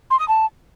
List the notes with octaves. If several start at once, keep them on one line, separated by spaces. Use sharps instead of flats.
C6
D#6
A5